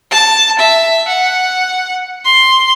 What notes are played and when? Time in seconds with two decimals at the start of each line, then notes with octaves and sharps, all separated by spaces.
0.11 A5
0.59 E5
1.07 F#5
2.25 C6